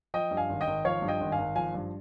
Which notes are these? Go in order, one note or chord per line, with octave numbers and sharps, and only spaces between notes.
F3 D#5 G5
G2
F5 G#5
G#1
D#5 G5
G#1
F3 C#5 F5
G2
D#5 G5
G#1
F5 G#5
G#1
F3 F5 G#5
G2